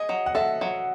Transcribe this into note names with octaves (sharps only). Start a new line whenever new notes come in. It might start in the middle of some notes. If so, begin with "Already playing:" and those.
Already playing: G#4 D#5
F#3
F#5
A4 E5
F#3